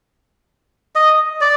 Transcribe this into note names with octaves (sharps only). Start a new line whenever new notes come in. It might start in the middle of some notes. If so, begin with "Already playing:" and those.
D#5
D5